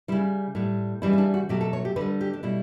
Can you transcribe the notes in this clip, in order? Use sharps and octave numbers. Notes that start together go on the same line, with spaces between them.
C#3 G3 E4
A2 G3
C#3 E3 G3 E4
E4
D4
F#4
B2 F#3 A3 G4
A4
C#5
G4
D3 G3 B4
G4
D4
B2 G3 E4